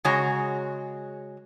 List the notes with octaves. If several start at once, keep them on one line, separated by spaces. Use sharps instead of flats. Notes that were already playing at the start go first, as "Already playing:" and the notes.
C#3 G#3 F#4 C#5 A#5